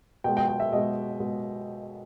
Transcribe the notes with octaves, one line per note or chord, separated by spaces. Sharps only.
B2 G#3 G5
G5
G5
E5
B2 G#3 D#5
B2 G#3